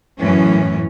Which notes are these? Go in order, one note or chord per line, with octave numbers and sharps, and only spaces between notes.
F#2 A2 E3 C#4